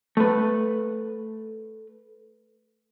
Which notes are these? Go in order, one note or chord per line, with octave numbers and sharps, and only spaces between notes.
A3 B4